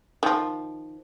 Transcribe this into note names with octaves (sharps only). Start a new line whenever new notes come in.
D#3 F3